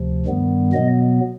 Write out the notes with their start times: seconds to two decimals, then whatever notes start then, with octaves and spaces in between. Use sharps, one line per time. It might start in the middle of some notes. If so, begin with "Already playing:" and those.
Already playing: D2 C3 F3
0.26 G2 D#3 G3 B3
0.73 B2 F#3 B3 D#5